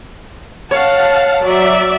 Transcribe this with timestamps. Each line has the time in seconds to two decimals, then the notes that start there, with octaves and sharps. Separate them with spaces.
0.71 C#5 F5 F#5 A5
1.43 F#3 D5 E5